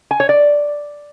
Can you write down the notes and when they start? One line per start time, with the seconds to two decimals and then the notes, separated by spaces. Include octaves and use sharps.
0.11 G#5
0.20 C#5
0.29 D5